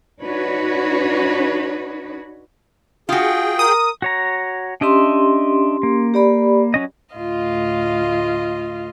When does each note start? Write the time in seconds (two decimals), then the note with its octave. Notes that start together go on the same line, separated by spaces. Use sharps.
0.22 D4 D#4 F#4 B4 C#5
3.09 F4 F#4 G#4 G5
3.59 A#4 D#6
4.02 F#4 C#5 A#5
4.81 C#4 D4 G4 D#5 E5 C6
5.83 A#3
6.14 G4 D5 B5
6.74 F#3 C#4 D#5
7.16 D2 A2 F4 D#5 F5